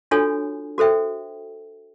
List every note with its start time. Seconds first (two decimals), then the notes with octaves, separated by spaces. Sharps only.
0.11 D4 F4 F#4 A4 C#5 G#5
0.78 F#4 A4 C5 E5 G5